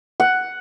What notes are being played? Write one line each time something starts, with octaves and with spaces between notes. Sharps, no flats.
F#5